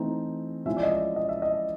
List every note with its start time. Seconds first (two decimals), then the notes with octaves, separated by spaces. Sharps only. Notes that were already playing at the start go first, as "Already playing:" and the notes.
Already playing: E3 A3 C4 D#4
0.66 F3 G#3 C#4 E4 E5
0.77 D5
0.83 D#5
0.92 E5
1.16 D#5
1.29 E5
1.42 D#5